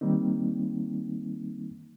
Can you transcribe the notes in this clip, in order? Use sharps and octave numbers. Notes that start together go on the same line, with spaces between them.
D#3 G3 A#3 C4 D#4